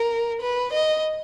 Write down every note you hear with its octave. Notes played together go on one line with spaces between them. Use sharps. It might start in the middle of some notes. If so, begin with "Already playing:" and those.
Already playing: A#4
B4
D#5